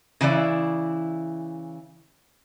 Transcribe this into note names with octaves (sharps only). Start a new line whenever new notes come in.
C#3 E3 E4 D5